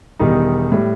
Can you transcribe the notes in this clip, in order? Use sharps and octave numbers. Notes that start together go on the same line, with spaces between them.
E1 E2 D#3 G3 D#4
A2 G3